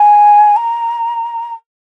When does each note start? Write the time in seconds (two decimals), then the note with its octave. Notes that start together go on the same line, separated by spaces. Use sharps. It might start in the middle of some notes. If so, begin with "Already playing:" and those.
Already playing: G#5
0.56 A#5